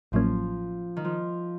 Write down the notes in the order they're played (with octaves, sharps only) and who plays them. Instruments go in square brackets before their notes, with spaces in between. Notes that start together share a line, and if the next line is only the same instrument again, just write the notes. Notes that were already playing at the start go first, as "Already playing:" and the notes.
[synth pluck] A1 A2 F#3 A#3 C#4 [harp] F3
[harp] D#3
F3